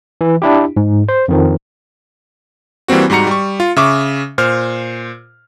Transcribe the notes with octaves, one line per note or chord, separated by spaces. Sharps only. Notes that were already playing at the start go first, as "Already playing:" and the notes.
E3
D4 E4 G4
G#2
C5
F2 D#3 F3
E3 G3 A#3 C4 F#4
G#2 G3 F#4 A#5 C#7
G3 C#6
F4
C#3 E5 C#6 D6
A#2 C5 F6